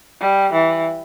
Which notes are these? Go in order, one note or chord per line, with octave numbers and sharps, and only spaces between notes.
G3
E3